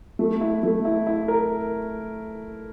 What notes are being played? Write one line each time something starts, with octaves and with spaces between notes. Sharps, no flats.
A3
E4
A3
E4
E4
A#4